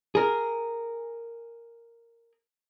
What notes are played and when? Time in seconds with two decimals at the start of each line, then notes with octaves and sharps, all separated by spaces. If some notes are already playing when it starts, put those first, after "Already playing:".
0.15 G#4 A#4